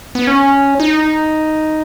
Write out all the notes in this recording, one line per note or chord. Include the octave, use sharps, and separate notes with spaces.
B3
C#4
D#4